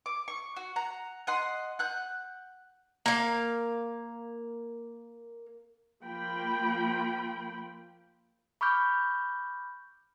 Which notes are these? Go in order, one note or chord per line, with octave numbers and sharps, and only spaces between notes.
D6
C#6
F#4
F#5 A#5
D#5 F#5 C6
F#5 F#6 G6
A#3 F5
F3 A#3 F4 G5 B5
B5 C#6 D6 F6 G6